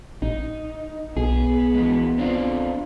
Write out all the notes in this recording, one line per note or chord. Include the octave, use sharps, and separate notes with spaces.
A1 D#4
B1 B3 G#4
E3 G#3
C4 D4 F4